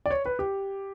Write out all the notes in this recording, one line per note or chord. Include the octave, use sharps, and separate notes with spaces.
D5
C#5
B4
G4